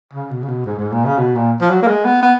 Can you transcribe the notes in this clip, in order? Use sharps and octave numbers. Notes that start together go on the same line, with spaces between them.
C#3
B2
C#3
B2
G#2
G#2
A#2
C#3
B2
A#2
F3
F#3
A#3
G#3
B3
B3